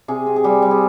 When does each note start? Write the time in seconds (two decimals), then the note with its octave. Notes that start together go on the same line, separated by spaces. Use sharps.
0.08 C3 G#4
0.27 C4
0.36 G#4
0.44 G3 G4
0.62 G3
0.71 G#4